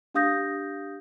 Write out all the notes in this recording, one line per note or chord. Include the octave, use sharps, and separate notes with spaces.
D4 G4 F5 D#6 G6 A#6